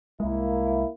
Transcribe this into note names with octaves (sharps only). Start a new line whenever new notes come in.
C2 G#3 A#3 E4